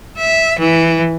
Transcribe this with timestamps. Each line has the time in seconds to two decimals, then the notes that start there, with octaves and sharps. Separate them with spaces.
0.18 E5
0.60 E3